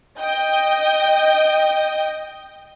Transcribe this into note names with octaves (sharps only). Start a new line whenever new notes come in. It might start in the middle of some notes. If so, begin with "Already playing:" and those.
D#5 G5 G6